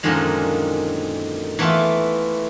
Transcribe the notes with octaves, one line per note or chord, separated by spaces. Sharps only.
F#2 A#2 D3 D#3 F3 G#3
E3 A3 B3 E4 F4